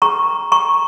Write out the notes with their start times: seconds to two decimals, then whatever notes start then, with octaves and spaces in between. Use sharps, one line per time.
0.02 C#4 G#4 B4 A#5 C#6
0.52 A#5 C#6